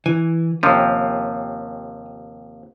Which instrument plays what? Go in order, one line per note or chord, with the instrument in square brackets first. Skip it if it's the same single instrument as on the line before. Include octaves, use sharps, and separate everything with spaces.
[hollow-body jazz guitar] E3 [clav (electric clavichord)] G#5
[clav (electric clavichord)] D#2 C3 F3 [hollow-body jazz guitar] C#4